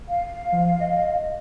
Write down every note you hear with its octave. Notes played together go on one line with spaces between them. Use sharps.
F5
F3
D#5